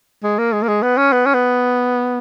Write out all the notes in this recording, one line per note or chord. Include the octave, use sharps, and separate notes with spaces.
G#3
A#3
G#3
A#3
G#3
B3
C#4
B3
C#4
B3